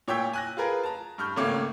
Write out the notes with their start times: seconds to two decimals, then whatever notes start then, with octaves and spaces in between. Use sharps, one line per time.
0.08 A#2 C#5 G5 E6 G6 B6
0.33 G#5 F#6 A#6
0.57 F4 G#4 A#4 B4
0.83 A5 A#5
1.18 G2 C#6 F6 G6
1.36 G#1 C#2 A3 A#3 C#4 D6